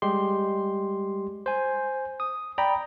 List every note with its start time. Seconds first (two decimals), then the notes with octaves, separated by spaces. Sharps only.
0.02 G3 G#3 G4 C6
1.46 C5 G#5
2.20 D#6
2.58 D5 G5 A#5 B5